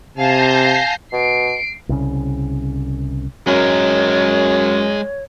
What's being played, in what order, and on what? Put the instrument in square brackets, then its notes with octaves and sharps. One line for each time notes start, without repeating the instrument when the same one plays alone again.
[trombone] C3 [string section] F5 G#5 A5 [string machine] G6 A#6 C7
[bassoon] B2 [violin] C7 D7
[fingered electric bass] C2 C#3
[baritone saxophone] F#2 [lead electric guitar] G#3 A#4 [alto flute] C#5